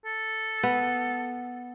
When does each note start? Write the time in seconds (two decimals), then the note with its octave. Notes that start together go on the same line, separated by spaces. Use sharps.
0.06 A4
0.63 B3